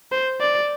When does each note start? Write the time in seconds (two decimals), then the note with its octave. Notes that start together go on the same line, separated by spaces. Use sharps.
0.12 C5
0.41 D5